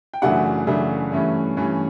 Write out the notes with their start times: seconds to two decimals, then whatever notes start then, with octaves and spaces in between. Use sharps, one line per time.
0.14 G5
0.22 F#2 C#3 E3 A3 D4 F#4 F#5
0.67 F#2 C#3 E3 A3 D4
1.12 G2 E3 A3 C#4
1.57 G2 E3 A3 C#4